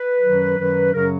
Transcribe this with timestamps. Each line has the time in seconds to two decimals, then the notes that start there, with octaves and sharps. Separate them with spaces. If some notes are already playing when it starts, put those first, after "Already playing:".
Already playing: B4
0.21 F#2 D#3 F#3
0.57 F#2 D#3 F#3
0.93 F#2 C#3 F#3 A#4